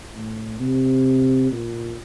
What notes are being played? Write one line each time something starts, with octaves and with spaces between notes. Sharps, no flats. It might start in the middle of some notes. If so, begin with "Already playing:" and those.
A2
C3
A#2